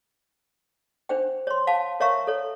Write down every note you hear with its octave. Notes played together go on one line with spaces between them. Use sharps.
D4 C5 G5
C#5 C6
F5 A5
A#4 C#5 E5 F5 A#5 C#6
A4 C#5